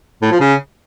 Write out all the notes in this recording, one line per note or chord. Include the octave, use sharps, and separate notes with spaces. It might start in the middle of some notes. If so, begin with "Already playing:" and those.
A2
F3
C#3